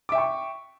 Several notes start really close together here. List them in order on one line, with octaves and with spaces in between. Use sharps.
D6 E5 G5 C#6